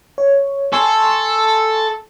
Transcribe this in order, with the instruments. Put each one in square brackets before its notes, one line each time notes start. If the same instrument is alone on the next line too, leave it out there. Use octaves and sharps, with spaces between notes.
[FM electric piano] C#5
[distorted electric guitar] A4 [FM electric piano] G#5 C6 C#6